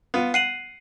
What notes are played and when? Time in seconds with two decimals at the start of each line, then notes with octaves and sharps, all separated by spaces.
0.14 B3 F4
0.34 F#5 C7 D#7 F#7